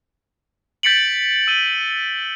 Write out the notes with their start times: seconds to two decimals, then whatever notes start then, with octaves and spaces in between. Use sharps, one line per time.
0.83 G6 A6 B6 C#7 D7 F#7
1.47 E6 D#7 G7